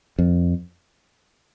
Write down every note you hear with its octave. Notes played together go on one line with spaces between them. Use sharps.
F2